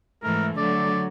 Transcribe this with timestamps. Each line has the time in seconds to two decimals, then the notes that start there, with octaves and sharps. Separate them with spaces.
0.23 G#2 E3 A3 A#4
0.57 D3 F#3 A3 D5